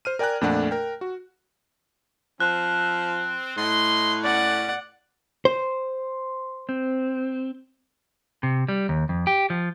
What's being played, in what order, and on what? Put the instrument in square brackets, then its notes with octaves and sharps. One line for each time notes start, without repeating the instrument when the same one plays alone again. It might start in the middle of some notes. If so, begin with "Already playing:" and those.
[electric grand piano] C5 F6 D#7
A#4 D5 G5 G#5 A#5 F#6
F2 A#2 A3 D4 D5 F#5
A#4 G5
F#4
[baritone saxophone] F3 [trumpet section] C4 [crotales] F#6
[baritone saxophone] A2 [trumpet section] D#5 C6
[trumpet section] C#4 [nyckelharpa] D5 F#5
[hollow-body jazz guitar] C5
[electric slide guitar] C4
[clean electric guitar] C3
G3
D#2
F2
G4
F3